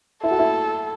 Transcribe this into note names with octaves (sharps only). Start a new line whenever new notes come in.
E4 A4
F#4
E4